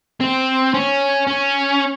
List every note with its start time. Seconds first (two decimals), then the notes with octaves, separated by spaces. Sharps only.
0.21 C4
0.74 C#4
1.27 C#4